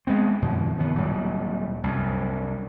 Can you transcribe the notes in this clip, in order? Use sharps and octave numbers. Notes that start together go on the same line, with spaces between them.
G#3 B3 C4
F#2 B2 D#3 F3
D#3 E3 B3
D1 A#2 F#3 G3
C2 F#2